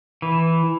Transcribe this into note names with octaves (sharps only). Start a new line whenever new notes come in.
E3